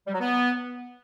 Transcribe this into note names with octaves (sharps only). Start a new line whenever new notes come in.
G3
F#3
B3